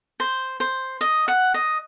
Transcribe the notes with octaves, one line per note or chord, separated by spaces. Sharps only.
C5
C5
D#5
F#5
D#5